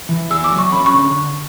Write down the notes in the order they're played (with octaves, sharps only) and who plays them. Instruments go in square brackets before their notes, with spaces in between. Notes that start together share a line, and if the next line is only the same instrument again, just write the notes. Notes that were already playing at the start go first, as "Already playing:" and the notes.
[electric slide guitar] E3
[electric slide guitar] G#4 [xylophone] E6
[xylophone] D6
[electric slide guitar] F#3
[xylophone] C#6
[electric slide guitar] C#4 [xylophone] B5
[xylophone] C#6
[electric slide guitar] D3